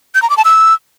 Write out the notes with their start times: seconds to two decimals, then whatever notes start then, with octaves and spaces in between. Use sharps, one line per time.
0.15 G6
0.22 A#5
0.30 D6
0.37 A5
0.45 E6